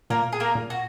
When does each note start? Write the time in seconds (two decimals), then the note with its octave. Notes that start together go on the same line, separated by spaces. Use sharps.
0.10 A#2 A#3 A#4
0.32 G#4
0.40 A#3 A#4
0.55 A#2
0.70 F#4